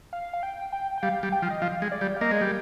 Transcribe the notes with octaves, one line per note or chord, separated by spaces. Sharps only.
F5
F5
G5
G5
G5
G3 F5
G3
G5
F3
D#5
F3 F5
G#3
D5
G3
F5
A#3 D#5
G#3
G3